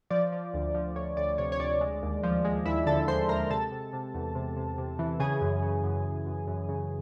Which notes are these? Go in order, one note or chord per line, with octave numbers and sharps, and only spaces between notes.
F3 D5
F3
D2
F3
D2 C#5
D2 D5
C3 C#5
C#5
D2 D5
G#3
D#2
F3
G#3
D#2 E4 E5
D3 A4 A5
G#3 C5 C6
G#3 A#4 A#5
C3 A4 A5
C3
C3
E2
C3
C3
C3
E3
C#3 G#4 G#5
F#2
C#3
F#2
F#2
F#2
F#2
C#3